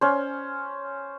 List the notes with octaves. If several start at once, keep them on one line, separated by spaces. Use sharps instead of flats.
C#4 C5